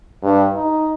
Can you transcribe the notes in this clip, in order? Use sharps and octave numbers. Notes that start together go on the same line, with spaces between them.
G2
D#4